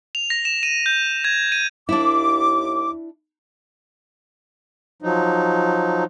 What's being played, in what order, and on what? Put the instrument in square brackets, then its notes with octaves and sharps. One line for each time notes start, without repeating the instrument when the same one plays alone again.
[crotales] F7
A#6
E7
D#7
G6
G#6
D#7
[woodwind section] D#2 D6 [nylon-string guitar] D4 E4
[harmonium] F3 F#3 D#4